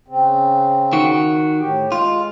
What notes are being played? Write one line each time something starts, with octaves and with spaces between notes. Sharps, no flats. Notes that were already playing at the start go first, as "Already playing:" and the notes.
C#3 C4
D#3 F#4
A2 G4
G#3 F4